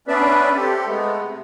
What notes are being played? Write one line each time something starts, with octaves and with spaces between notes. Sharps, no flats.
B3 C#4 D4 B4 D5 E5
C4 G4 A4
G#3 A3 B3
C3